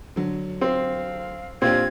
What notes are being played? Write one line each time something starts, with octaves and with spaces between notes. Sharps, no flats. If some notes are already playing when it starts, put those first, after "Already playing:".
D3 F#3
C4 F5
A#2 C4 D4 F4 G4 G#6